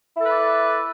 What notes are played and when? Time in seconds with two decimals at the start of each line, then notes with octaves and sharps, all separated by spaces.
0.16 E4
0.21 A4
0.26 B4
0.31 D5